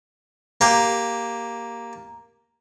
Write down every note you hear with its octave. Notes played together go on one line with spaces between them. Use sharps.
A#3 G4